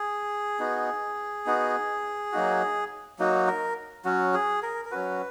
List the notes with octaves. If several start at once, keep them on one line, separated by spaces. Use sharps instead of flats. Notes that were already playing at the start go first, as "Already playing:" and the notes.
Already playing: G#4
B3 D#4 F#4
B3 D#4 F#4
F#3 A#3 D#4 F#4
F#3 A#3 D#4 F#4
A#4
F#3 C#4 F#4
G#4
A#4
A#4
F#3 C#4 F#4 B4